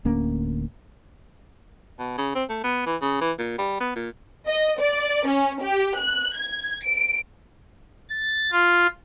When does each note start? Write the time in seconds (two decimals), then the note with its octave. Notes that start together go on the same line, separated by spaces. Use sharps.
0.05 D1 D2 A#3 C#4
1.99 B2
2.18 C#3
2.35 C4
2.49 A3
2.64 B3
2.86 E3
3.01 C#3
3.21 E3
3.38 A#2
3.58 G3
3.80 B3
3.96 A#2
4.46 D#5
4.79 D5
5.27 C#4
5.61 G4
5.97 F#6
6.36 G#6
6.84 D7
8.10 A6
8.51 F4